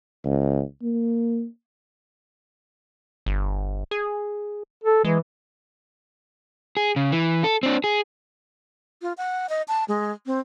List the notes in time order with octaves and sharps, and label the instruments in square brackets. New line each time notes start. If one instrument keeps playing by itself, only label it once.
[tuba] C#2
A#3
[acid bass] G1
G#4
[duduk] A4
[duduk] E3 [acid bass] G#3
[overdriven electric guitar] G#4
C#3
E3
A4
C4 D4
G#4
[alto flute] F4
F#5
D#5
A5
G#3
C4